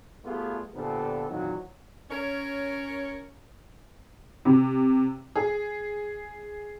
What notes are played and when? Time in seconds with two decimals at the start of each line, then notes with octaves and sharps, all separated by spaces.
0.24 G3 A3 B3 F4 G4 G#4
0.75 A#2 D3 F3 B3 G4 A4
1.28 F2 A#2 D#3 E3 F#3
2.10 C#4 A#4 C#5
4.45 C3
5.35 G#4